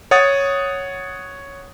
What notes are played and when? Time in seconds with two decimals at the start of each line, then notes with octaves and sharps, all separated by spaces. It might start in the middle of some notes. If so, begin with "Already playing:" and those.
0.11 C#5 F#5 D#6 A6